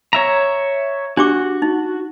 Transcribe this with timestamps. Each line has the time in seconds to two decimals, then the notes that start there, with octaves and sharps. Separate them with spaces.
0.13 C#5 E5 A#5
1.17 D4 F#4 G4 D6
1.62 D#4